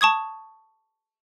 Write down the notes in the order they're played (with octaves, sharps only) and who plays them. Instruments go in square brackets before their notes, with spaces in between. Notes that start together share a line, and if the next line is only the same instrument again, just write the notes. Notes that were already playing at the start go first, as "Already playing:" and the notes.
[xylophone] A5 C#6 D#6 G#6